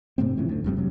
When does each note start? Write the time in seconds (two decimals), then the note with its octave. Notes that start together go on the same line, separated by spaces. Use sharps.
0.18 G#2 C3 A3 C4
0.37 G#2 C#3 E3 F3
0.49 D2
0.64 F1 G2 G3 C4
0.77 C3 F#3